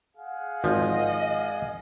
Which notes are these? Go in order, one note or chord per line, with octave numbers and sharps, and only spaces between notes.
G#4 F5 F#5
G#1 F3 D#5